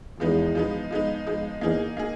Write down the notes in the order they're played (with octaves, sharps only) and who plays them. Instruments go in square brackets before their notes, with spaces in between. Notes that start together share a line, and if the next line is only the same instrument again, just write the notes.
[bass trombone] E2 [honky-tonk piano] F3 G#3 B3 D#4
[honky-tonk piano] F3 G#3 B3 D#4
F3 G#3 B3 D#4
F3 G#3 B3 D#4
[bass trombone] E2 [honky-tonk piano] A#3 D#4 G#4
[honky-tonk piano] A#3 D#4 G#4